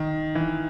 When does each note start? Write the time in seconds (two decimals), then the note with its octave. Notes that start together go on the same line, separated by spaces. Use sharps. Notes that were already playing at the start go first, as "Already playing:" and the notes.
Already playing: D#3
0.35 E3